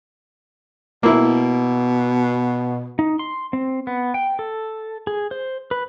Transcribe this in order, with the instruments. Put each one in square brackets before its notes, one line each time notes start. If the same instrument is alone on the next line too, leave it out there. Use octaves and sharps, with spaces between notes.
[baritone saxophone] B2 [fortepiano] A#3 E4
[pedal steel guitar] D#4
C6
C4
B3
G5
A4
G#4
C5
B4